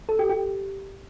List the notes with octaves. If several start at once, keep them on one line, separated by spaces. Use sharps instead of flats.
A4
G4
G4